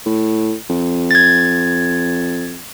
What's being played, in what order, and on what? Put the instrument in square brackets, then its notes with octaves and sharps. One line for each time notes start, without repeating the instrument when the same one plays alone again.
[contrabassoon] A2
F2
[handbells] G#6 A6